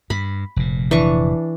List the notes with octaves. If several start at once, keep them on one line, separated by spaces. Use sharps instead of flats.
G2 B5
F1 A#2
E3 D4 C#6